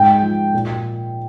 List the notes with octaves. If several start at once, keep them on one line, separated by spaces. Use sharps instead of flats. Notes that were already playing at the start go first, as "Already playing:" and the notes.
Already playing: G#2 G5
F3
A#2